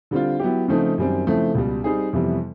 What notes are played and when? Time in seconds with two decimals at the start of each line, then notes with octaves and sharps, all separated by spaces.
0.11 D3 G3 C4 F4
0.39 F#3 B3 E4 G4
0.68 C#3 F3 A3 C4 D#4
0.98 F#2 D#3 G3 C4
1.27 C#3 F3 A3 C4 E4
1.55 C#2 B2 G3
1.84 G3 C4 D#4 G#4
2.13 F2 C3 E3 G3 B3